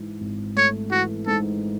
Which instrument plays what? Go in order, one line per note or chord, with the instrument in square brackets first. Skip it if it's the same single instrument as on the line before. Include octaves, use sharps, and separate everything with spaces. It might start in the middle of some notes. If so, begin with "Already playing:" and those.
Already playing: [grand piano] G#2 E3
G#1
[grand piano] A3 [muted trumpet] C#5
[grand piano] E3 [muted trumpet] F#4
[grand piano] G#2 [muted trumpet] A4